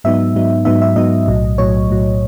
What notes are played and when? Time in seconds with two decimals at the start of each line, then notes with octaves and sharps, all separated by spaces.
0.04 G#2 F#3 B3 D#4 E5
0.35 G#2 F#3 B3 D#4
0.65 G#2 F#3 B3 D#4 E5
0.82 E5
0.96 G#2 F#3 B3 D#4 D#5
1.27 B1 A2 F#3
1.58 B1 A2 F#3 C#5
1.89 B1 A2 F#3